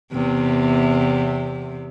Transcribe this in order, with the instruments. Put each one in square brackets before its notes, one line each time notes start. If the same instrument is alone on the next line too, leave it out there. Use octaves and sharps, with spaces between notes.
[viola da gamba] E2 C3